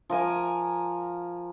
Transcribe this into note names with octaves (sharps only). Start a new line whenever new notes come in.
F3 A#4 G#5 D6